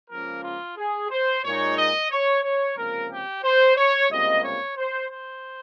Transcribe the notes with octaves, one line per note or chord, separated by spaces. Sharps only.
C#2 C#3 F3 A#3 A#4
F4
G#4
C5
A#2 G#3 D#4 C#5
D#5
C#5
C#5
C#2 C3 F3 A#3 C#4 A#4
G4
C5
C#5
C#2 C3 G3 A#3 D#5
C#5
C5
C5